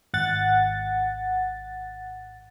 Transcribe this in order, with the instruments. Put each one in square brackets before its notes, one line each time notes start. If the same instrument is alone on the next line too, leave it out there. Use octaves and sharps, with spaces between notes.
[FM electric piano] G#1 F#5 A6